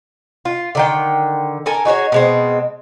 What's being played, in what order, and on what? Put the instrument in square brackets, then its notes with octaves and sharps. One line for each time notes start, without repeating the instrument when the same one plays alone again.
[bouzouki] F4
D3 D#3 G5
A4 A#4 G#5
D#4 F#4 G#4 C#5
B2 G#3 C4